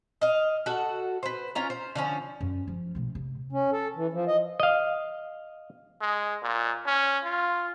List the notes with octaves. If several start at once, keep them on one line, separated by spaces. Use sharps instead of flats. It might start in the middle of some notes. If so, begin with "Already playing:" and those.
D#5 F5
F#4 A4 F#5
B4 C5
C#4 F4 A#5
C5
D3 F3 C#4
F#2
F3
B2 A3
C3
C#4
A4
E3
F3
D#5
D#5 F5
G#3
A#2
C#4
F4